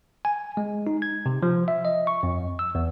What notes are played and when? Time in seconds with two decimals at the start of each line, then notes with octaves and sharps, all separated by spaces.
0.25 G#5
0.57 G#3
0.87 D#4
1.02 G#6
1.26 C3
1.43 F3
1.68 E5
1.85 D#5
2.07 C#6
2.23 F2
2.59 E6
2.75 E2